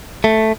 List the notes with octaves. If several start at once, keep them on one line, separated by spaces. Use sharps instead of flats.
A3